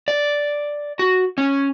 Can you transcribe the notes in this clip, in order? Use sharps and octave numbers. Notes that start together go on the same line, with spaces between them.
D5
F#4
C#4